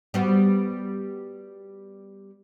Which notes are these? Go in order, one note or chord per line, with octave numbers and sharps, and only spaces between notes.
G3 B3 F#4